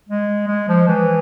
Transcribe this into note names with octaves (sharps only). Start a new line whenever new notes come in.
G#3
G#3
F3
E3